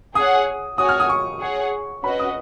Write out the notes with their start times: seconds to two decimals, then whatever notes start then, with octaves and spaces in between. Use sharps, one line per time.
0.15 G#4 C#5 F#5 D#6
0.78 F#4 C#5 G#5 D#6
0.89 F6
1.00 D#6
1.09 C#6
1.41 G#4 C#5 F#5
2.04 C#4 F#4 B4 D#5 B5
2.19 D#6